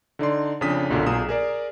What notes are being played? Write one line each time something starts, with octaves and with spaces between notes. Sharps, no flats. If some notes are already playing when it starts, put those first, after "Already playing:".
D3 D#4 D5 C6
F2 C#3 D4 D#6 B6
B1 F#2 A#2 D3 F#4
B1 A#2 G#4 A#5 D#6 E7
G#4 A#4 D5